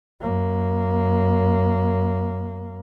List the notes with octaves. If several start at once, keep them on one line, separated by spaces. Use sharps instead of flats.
F#2 A#3